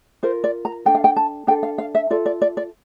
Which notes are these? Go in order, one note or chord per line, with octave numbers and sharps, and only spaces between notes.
F4 A#4 C5
D5
A#5
D4 A4 G5
F5
G5
A5
D4 A4 G5
F5
F5
E5
F4 A4 D5
D5
D5
D5